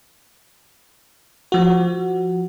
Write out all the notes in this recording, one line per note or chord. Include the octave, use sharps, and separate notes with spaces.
F3 F#4